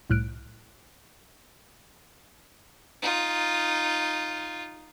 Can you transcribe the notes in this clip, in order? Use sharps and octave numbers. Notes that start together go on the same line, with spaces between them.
C2 A2 F6 F#6 D7
D#4 F4